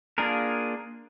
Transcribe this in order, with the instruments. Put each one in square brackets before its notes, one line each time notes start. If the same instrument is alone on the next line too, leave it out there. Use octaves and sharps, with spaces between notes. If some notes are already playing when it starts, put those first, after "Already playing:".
[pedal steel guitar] A#3 D4 F4 G#4 A#4